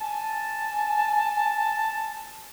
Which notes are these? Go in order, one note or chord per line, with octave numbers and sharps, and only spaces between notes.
G#5 A5